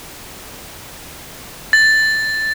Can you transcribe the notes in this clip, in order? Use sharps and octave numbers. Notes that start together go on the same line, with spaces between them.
A6